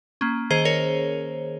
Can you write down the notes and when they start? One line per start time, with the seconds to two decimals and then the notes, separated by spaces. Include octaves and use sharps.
0.21 A#3 C#4
0.50 D#3 G#4 C5
0.65 A#4 C#5